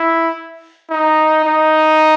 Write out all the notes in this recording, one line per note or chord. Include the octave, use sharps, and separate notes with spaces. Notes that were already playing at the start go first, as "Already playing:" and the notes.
Already playing: E4
D#4
D#4